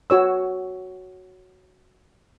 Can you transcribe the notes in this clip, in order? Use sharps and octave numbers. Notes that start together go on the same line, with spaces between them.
F#4 C#5 E6